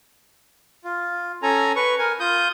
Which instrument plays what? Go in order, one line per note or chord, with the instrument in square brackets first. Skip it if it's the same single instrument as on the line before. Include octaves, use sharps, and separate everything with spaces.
[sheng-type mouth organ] F4
C#4 A4 G#5 A#5
B4 C#6
A#4 G#5
F4 D#6 G6